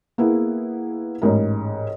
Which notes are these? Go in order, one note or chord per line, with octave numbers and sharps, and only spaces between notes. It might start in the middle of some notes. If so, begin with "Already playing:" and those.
A#3 B3 E4 G#4
A1 G#2 A#4